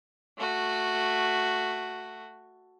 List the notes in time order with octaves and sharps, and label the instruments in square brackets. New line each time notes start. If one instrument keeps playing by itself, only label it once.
[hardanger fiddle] A3 F#4